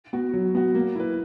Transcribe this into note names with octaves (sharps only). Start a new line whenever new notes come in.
B3 F#4
F#3
B3 F#4
A#3
E4 B4